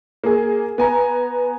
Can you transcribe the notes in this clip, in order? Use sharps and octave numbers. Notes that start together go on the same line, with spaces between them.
A#3 G#4
B3 G#5 A#5